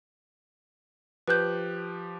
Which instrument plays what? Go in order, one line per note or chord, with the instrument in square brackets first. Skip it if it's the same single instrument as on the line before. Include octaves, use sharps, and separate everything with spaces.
[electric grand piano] F3 G4 F#6 [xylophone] B4 G6